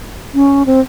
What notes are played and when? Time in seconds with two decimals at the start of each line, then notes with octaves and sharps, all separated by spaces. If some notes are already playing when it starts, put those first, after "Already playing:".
0.34 C#4
0.66 C4